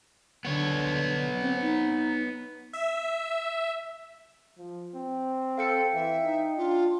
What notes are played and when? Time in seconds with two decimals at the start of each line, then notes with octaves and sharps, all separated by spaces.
0.45 D3 B3 C#5
1.41 C4
1.61 D#4
2.73 E5
4.58 F3
4.95 C4
5.58 A4 F5 G5 C#7
5.94 E3 E5
6.24 D#4
6.57 D4 F4